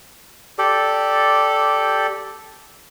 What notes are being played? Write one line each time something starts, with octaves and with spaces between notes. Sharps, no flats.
G4 A4 D5